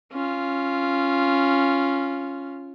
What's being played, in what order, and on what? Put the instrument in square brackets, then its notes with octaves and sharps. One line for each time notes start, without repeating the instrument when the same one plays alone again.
[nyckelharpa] C#4 F4